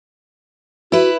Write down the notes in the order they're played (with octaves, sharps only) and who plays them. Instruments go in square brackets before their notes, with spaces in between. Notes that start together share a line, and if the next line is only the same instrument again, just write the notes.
[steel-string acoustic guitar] E4 B4 [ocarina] F#4